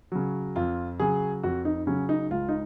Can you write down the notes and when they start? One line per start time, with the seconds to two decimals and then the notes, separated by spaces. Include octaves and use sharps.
0.12 C#3 F#3
0.56 F2 F4
1.00 C#3 F#3 G#4
1.43 F2 F#4
1.65 D#4
1.87 C#3 F#3 C#4
2.09 D#4
2.31 C#2 F4
2.49 D#4